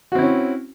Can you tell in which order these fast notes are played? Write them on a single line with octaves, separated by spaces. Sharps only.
F#4 C4 E4 C#4